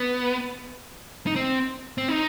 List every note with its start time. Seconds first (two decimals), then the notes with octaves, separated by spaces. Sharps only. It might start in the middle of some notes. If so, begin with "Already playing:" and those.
Already playing: B3
1.27 D#4
1.36 C4
1.98 C4
2.09 D#4